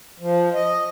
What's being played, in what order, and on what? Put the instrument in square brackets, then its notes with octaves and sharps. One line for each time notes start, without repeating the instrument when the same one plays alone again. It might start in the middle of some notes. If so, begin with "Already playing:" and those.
[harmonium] F3
D#5